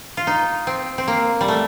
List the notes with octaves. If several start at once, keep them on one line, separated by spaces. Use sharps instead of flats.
F4
D#4
C4
C4
A#3
G3
A3